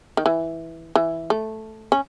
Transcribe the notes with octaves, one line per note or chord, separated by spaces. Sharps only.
D#3
E3
E3
A3
C#4